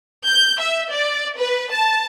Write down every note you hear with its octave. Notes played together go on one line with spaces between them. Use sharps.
G6
E5
D5
B4
A5